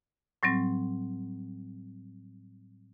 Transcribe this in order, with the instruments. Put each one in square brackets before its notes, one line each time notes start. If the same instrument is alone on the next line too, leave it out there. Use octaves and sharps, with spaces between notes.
[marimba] A2 F#3 G3 C4